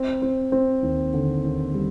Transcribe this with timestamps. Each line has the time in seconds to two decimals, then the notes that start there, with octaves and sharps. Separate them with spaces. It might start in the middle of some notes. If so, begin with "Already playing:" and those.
Already playing: C4
0.22 C4
0.52 C4
0.82 D#2
1.14 D3
1.45 D#2
1.74 G3